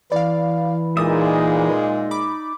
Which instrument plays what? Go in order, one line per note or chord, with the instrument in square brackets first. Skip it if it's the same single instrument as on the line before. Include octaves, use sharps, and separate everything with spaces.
[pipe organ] E3 E4 [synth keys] D5 F5
[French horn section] A#2 G#3 [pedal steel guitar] D#4 D5 E5 [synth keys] D#6
[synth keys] B5 D6